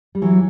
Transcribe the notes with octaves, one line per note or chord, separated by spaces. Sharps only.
G3
E3 F#3